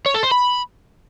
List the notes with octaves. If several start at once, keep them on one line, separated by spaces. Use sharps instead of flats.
C#5
A4
C5
B5